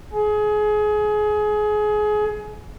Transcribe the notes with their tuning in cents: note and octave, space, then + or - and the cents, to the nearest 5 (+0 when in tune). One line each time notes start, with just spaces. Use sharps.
G#4 +25